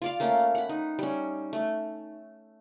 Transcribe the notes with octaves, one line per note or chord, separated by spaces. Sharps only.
F4 D5 F5
A3 A#3 C#4
F#5 B5
D#4
G3 C#4
A3